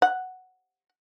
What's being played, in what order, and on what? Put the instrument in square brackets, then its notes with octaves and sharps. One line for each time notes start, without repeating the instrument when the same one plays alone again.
[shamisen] F#5